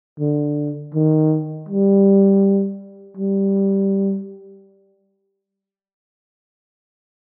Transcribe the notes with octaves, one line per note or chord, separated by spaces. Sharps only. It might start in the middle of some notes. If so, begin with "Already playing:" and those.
D3
D#3
G3
G3